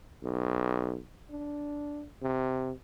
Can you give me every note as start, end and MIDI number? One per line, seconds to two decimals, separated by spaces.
0.24 0.97 35
1.30 2.04 62
2.22 2.71 48